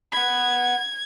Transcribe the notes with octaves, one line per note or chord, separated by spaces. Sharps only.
F#5 B5 G#6